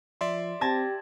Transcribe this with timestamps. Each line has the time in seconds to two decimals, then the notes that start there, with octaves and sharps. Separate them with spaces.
0.21 F3 D5 E5 C6
0.61 C4 G4 A5 G#6 A#6